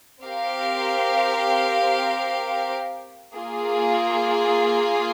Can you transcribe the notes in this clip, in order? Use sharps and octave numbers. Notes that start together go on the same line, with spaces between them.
C4 G4 A#4 F5
A#3 F4 G#4